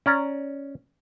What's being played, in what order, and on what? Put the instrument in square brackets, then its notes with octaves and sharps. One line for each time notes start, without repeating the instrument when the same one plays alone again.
[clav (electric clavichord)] C#4 D5 A#5